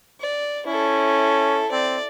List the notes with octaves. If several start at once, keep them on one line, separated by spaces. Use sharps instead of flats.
D5
C#4 E4 A4
C4 D5